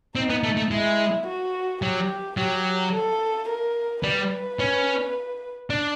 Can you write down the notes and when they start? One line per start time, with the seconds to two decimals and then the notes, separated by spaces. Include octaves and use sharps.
0.15 C4 D#4
0.30 B3
0.43 A3
0.57 A3
0.71 G#3 E4
1.27 F#4
1.82 F#3 G4
2.37 F#3 G4
2.93 A4
3.49 A#4
4.03 G3 B4
4.59 C#4
5.70 D4